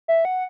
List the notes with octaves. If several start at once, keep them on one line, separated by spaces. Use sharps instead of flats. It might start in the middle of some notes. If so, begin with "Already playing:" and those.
E5
F#5